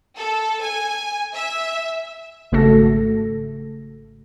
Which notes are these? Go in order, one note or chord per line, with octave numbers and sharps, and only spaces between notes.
A4
G#5
E5
G#1 C#3 A3 F#4 A4 A#6